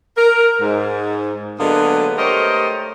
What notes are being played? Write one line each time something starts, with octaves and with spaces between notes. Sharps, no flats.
A#4
G#2
D3 F#3 G#3 A#3 B3
A3 G4 A#4 C5 C#5 D#5